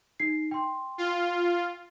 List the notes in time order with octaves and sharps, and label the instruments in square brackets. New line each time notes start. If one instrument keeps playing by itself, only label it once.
[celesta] D#4 C7
G5 C6
[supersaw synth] F4